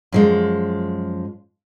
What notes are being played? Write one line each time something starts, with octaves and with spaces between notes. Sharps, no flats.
F#2 F3 G#3